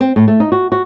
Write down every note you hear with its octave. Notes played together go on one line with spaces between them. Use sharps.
C4
A2
A3
D#4
F#4
F#4